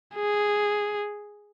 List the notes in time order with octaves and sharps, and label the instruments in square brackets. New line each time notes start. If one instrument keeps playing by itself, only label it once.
[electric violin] G#4